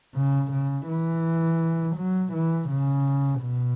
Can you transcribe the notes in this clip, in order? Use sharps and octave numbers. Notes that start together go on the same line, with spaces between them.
C#3
C#3
E3
F#3
E3
C#3
B2